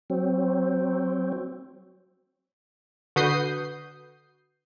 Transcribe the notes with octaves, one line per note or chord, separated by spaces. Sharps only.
F#3 C4
D3 F#4 B4 D#6 G6 C7